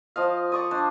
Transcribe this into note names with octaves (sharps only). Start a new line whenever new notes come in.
F3 D#5 F5
D5 C#6 D#6
D4 C5 D#5